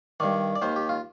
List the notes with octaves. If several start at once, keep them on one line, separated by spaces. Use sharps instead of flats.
G2 D#3 D5
D5
D#2 D#3 C5
G4
F4